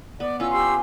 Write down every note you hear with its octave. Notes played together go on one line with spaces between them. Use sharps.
B3 D5
C#4 F4 E6
G4 C6 E6